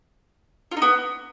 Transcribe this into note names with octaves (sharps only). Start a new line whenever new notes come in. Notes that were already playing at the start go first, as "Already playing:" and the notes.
F4
D#4
B3